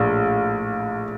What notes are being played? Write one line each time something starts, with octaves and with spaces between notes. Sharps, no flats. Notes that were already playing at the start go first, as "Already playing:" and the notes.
Already playing: A#1 A2